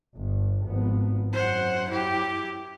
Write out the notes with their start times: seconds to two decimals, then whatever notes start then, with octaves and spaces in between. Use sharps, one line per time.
0.16 G1
0.66 G#1 F3 B3
1.33 F#2 C5 F#5
1.89 E4 G4